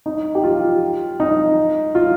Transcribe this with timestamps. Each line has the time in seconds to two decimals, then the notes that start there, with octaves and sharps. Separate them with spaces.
0.06 D#4
0.35 G4
0.44 F4
1.20 D#4
1.95 F4